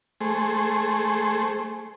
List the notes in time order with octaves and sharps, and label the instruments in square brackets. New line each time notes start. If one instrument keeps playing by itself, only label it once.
[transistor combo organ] A3 G#4 C5